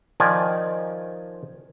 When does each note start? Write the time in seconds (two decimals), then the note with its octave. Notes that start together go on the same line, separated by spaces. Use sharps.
0.20 D#3 F3 D5 G#5